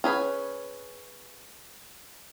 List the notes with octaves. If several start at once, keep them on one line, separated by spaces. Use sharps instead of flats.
C#4 G#4 B4